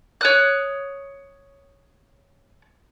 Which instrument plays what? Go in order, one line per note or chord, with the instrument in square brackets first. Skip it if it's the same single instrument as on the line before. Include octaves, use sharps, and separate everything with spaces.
[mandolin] C#5 D#6 F#6